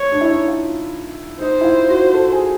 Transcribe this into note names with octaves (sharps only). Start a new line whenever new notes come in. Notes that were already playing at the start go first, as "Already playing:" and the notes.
Already playing: C#5
D4
E4
D#4
F4
D#4 C5
E4
F4
F#4
A4
G#4